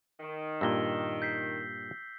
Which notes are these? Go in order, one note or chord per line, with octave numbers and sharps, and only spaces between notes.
D#3
G2 A#2 E6 A#6 G7
G6 B6 C7